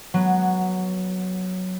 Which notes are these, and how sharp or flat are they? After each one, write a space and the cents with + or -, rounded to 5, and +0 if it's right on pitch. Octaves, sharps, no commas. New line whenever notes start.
F#3 +0 B3 -15